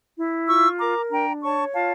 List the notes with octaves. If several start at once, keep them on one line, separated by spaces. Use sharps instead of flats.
E4
F4 C#6 E6
A#4 A#5 D6
D4 G5 A#5
C#5 A5 C#6
F4 F5 A5